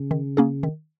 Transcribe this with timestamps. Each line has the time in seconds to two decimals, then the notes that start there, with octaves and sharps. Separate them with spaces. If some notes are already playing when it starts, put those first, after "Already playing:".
Already playing: C#3
0.11 D#3
0.37 A#3 C#4 G#4
0.63 D#3